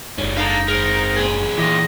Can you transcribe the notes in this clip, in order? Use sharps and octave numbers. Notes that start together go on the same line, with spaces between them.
F#1 G#2 G3 C#4
D3 D#4 A4 F5 A#5
G#3 C4 A#4
A#2 G#4
E3 F4 G4 D#5